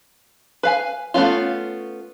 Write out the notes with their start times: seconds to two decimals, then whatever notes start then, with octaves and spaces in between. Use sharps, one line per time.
0.63 B4 F5 G#5
1.14 A3 B3 C#4 F4